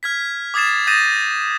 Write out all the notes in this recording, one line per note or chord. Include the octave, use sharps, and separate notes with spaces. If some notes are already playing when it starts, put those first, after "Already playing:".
F6 G#6 B6
D6 D#6 G#6 A6 C7 E7
D#6 G6 A6 A#6 D#7 E7